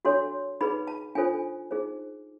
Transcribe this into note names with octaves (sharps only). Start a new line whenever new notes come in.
D4 F#4 A4 C#5 C6
D#4 G#4 B4 B5
A5
D4 F4 A4 C5 G#5
D#4 G#4 C5